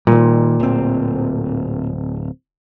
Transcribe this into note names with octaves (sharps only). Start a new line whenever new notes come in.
A#2 D#3 G3
D1 C4